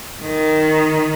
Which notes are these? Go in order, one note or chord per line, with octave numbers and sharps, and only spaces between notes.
D#3